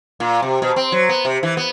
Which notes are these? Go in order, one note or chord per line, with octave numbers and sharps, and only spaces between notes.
A#2
C3
B2
C4
F#3
B3
C3
E3
B3